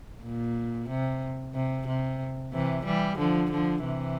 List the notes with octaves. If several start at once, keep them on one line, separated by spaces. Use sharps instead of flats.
A#2
C3
C3
C3
C3 E3
E3 G3
D3 F3
D3 F3
C3 E3